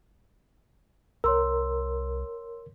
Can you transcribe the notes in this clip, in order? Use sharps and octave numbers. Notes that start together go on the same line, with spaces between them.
C2 A#4 C#5 C6 E6